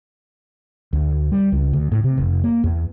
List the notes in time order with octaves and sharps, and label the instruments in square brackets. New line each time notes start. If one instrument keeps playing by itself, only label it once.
[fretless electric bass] D2
G3
C#2
D2
A2
C3
F1
A#3
E2